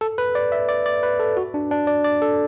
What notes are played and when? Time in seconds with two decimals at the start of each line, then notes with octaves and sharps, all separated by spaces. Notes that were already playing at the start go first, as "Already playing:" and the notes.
0.01 A4
0.18 B4
0.35 D5
0.52 E5
0.69 D5
0.86 D5
1.03 B4
1.19 A4
1.37 F#4
1.54 D4
1.71 D4
1.87 D5
2.04 D5
2.22 A4